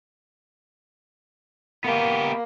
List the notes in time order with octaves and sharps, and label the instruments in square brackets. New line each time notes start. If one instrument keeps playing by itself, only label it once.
[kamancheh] A#3 [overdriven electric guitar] B3 G4